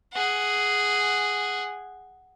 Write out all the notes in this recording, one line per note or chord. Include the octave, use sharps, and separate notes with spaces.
G#4 F#5